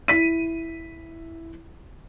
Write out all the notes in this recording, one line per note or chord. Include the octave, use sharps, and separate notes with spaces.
E4 B6 D#7